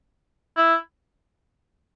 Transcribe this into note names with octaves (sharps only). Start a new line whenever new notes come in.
E4